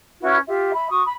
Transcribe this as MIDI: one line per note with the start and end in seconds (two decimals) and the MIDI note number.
0.22 0.37 61
0.22 0.37 64
0.22 0.37 66
0.22 0.37 71
0.47 0.70 65
0.47 0.70 67
0.47 0.70 76
0.74 0.90 76
0.74 0.90 83
0.90 1.01 66
0.90 1.01 85
0.90 1.01 87
1.05 1.12 83